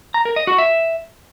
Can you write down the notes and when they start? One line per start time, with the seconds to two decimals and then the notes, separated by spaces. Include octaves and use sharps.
0.14 A#5
0.25 A#4
0.36 D#5
0.47 F#4
0.58 E5